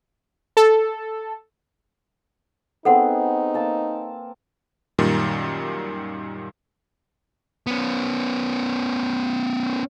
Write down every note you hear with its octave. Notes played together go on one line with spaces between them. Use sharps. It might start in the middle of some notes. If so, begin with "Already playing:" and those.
A4
B3 C4 D#4 G#4 A4 F#5
A#3 A5 E6
F#2 A#2 D#3 G3
B3 C#4